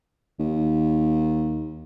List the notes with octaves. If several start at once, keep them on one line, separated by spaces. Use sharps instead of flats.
D#2